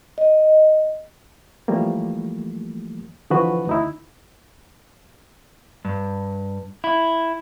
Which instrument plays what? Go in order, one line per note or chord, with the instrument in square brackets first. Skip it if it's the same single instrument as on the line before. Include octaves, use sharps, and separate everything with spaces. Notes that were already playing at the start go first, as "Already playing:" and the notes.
[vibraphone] D#5
[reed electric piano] E3 F3 G3 A3 A#3
D3 E3 F3 F#4 B4
D2 D#4 E4
[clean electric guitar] G2
E4